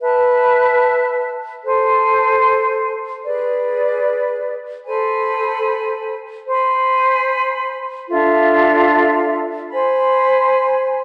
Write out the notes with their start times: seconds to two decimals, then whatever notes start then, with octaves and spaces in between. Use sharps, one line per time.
0.01 B4 E5 A5
1.63 A4 C5 G#5
3.25 G#4 B4 D5
4.87 A4 C5 G#5 B5
6.48 C5 G#5 B5
8.09 D4 F4 A4 E5
9.71 C5 G#5 B5